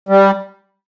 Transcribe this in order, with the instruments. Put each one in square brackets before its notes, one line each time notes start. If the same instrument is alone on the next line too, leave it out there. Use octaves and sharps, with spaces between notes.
[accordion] G3